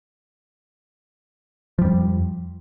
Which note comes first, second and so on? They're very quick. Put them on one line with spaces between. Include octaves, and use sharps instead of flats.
F3 G3 F2